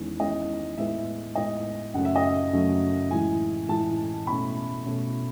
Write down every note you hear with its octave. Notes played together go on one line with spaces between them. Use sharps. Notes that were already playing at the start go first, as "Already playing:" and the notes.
Already playing: E2 D#3 G#3 C#4
E2 D#3 G#3 C#4 D#5
A2 G#3 B3 E5
A2 G#3 B3 D#5
F#2 C#3 F#3 A3 C#4 F#5
E5
D#5
E5
F#2 C#3 F#3 A3 C#4
A2 E3 G#3 G#5
A2 E3 G#3 A5
B2 A3 C#4 B5
B2 A3 C#4